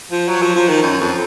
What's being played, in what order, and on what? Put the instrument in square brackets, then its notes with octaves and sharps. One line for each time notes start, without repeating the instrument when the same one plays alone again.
[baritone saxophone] F3
F#3
F3
F3
D#3
F#2
F2